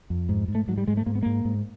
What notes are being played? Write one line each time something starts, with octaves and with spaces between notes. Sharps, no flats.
F2
G#2
G#2
A3
G#2 F#3
G3
G#2 G#3
A3
G#2 A#3
B3
G#2 A#3
G#2